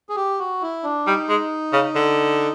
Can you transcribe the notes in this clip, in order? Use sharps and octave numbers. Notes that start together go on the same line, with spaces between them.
G#4
G4
F#4
E4
D4
G3 D#4
G#3
C#3
D3